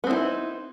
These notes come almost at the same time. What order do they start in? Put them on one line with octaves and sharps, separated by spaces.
B3 C4 E4 D#4